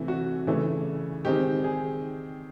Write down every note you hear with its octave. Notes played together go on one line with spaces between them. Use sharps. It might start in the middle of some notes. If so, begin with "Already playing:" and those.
Already playing: C3 E3 A3
F#4
C#3 E3 A3
D#3 G#3 C4 D#4 G4
G#4